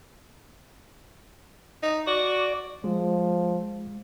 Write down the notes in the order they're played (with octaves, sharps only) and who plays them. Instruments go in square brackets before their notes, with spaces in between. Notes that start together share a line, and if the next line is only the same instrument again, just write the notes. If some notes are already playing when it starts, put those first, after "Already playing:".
[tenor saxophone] D#4
[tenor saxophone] F#4 [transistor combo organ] D5
[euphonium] F3 [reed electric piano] G#3